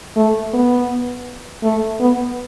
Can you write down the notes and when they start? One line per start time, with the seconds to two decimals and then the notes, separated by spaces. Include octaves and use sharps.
0.16 A3
0.53 B3
1.63 A3
2.00 B3